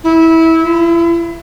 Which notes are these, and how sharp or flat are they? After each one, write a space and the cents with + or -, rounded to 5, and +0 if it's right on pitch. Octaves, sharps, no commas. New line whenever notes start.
E4 -20
E4 +35